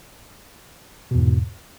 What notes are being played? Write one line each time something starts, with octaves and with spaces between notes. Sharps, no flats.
E2 G#2 B2